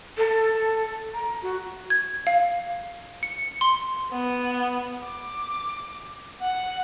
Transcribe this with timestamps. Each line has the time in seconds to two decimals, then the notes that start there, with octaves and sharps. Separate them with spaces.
0.18 A4
1.14 A#5
1.42 F#4
1.90 G#6
2.27 F5
3.23 C#7
3.61 C6
4.11 B3
5.04 D6
6.41 F#5